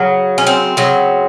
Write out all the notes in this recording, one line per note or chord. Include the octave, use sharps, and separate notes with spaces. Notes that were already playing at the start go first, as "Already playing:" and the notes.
Already playing: C#3 F#3
C#4
C4
C#3 F#3